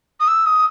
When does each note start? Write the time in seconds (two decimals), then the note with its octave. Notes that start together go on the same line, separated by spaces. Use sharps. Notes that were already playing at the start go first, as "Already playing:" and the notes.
0.20 D#6
0.28 E6
0.46 D#6